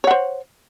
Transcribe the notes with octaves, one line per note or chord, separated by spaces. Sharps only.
C5 C#5 F#5